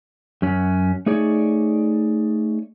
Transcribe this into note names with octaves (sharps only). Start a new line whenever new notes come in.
F#2 F#3 C#4
A3 D#4 G#4 C#5 D5